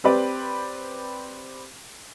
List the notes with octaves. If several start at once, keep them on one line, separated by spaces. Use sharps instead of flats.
C4 G4 B4 D5